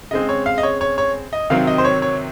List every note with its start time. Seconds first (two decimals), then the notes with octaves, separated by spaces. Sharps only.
0.11 C#3 G#3 C4 D#5
0.29 C#5
0.46 F5
0.58 D#5
0.63 C#5
0.81 C#5
0.98 C#5
1.33 D#5
1.50 C3 D#3 F#3 C4 F5
1.67 D#5
1.78 C5
1.85 C#5
2.02 C#5